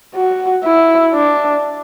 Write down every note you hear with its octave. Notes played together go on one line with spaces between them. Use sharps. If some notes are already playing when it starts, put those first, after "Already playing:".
F#4
E4
D4